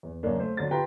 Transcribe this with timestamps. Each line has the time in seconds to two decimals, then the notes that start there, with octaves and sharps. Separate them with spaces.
0.03 E2
0.23 F#2 C#3 A#3 D4
0.39 A3 C5
0.57 D3 F#3 A6
0.71 F4 G4 B4 G5 A#5 C6